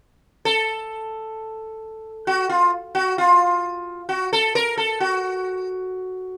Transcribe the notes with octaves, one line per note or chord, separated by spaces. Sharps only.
A4
F#4
F4
F#4
F4
F#4
A4
A#4
A4
F#4